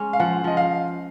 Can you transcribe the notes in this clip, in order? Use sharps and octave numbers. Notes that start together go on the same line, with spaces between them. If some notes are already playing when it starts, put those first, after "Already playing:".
Already playing: G#3 C#4
F5
F3 F#5
F3 D#5
F5